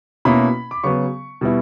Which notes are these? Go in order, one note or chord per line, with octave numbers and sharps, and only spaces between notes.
B2 A#3 C#4 E4 B5
D6
C#3 F#3 B3 C#6
B2 G3 B3 E4